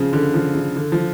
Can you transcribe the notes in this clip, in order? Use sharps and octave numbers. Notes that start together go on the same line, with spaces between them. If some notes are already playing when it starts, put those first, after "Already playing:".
Already playing: C#3 F3
D3
F3
C#3
D3
F3